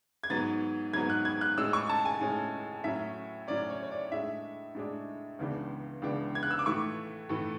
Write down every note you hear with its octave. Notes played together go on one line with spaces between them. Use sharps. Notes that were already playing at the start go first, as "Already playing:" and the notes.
G#6
G#2 F#3 B3 A6
G#2 F#3 B3 G#6
F#6
G#6
F#6
A2 G#3 C#4 E6
C#6
A5
G#5
A2 G#3 C#4
A2 F#3 C#4 E5
A2 F#3 C#4 D5
C#5
C#5
D5
A2 G#3 D4 E5
A2 G#3 D4
C#2 C#3 E3 B3 D4
C#2 C#3 E3 B3 D4
G#6
F#6
E6
D6
A2 E3 A3 C#6
A2 E3 A3